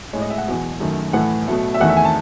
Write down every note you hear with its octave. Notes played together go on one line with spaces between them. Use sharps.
A2 G#3 C#5
D#5
E5
F#5
E2 B2 F#3
F#2 D#3 A3
A2 E3 A3 F#5
B2 F#3 A3
E5
E2 D#3 A3 F#5
E5
G#5
A5